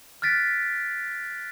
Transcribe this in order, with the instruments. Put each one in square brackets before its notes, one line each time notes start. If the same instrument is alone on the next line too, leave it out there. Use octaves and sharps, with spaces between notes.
[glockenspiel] F6 F#6 A6 B6 D7